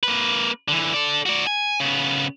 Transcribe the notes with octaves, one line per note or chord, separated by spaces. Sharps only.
A#3 B4
D3 E3
A4 D5
F#4 D5
G#5
C#3 B3